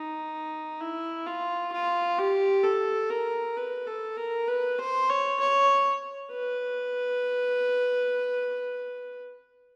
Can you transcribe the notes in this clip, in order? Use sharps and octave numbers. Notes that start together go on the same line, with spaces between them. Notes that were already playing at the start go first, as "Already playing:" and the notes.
Already playing: D#4
E4
F4
F4
G4
A4
A#4
B4
A4
A#4
B4
C5
C#5
C#5
B4